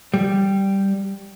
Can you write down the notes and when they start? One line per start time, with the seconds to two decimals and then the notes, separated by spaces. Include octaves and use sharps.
0.14 G3